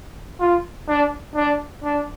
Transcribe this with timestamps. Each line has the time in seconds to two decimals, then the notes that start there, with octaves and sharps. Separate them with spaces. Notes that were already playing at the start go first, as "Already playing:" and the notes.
0.40 F4
0.88 D4
1.36 D4
1.84 D4